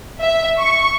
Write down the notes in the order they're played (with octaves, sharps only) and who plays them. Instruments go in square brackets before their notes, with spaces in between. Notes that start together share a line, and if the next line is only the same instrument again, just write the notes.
[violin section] E5
C#6